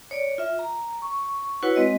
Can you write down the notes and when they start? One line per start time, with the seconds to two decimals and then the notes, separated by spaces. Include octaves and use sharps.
0.11 C#5 D5
0.38 F4 E5
0.59 A#5
1.02 C#6
1.63 E4 F#4 B4 C#5 F#5
1.76 G#3 C4 D#5